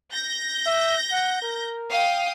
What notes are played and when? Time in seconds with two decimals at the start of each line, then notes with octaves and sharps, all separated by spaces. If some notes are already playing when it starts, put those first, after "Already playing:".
0.12 G6 A#6
0.66 E5
1.12 F#5
1.42 A#4
1.90 F5 G5 D#6